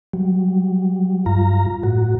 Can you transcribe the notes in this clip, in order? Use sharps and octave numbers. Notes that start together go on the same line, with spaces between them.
F#3 G3
G2 F4 A#5
A2 F#4